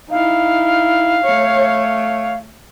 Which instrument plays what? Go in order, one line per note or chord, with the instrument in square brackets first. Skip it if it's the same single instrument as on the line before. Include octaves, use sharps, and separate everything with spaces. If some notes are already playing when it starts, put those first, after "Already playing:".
[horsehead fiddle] D#4 E4 [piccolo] F5
[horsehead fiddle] A3 C#5